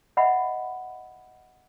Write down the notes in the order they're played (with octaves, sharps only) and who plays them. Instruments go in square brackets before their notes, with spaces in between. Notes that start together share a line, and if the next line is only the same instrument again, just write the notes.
[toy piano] D#5 E5 F#5 B5